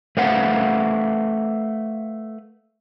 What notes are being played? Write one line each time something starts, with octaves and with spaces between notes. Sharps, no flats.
A3 B4 C5 F5 F#5